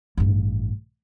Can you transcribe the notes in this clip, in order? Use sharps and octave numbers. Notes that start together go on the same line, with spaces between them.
A1 G2